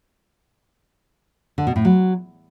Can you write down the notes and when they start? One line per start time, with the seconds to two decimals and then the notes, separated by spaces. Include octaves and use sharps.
1.58 D3
1.67 B2
1.76 A2
1.85 F#3